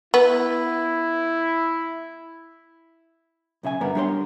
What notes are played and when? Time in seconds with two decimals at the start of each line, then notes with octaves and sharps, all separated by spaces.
0.14 B3 E4
3.63 B1 C#3 E5 G#5
3.81 G2 D3 G3 B3 A#4
3.95 G3 D4 F4 A#4 C#5 C6